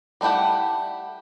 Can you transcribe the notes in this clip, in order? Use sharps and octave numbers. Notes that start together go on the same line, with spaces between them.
G3 A3 E4 G4 F#5